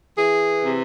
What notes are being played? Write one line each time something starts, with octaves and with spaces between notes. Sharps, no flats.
E3 G#4
C3